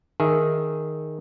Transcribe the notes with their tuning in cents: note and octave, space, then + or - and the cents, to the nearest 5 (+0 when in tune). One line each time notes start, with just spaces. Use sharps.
D#3 +0 G#4 +0 E5 +0